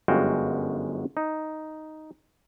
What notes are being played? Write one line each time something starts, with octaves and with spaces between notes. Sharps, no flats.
G1 F#2 G#3 F#4 F5 G5
D#4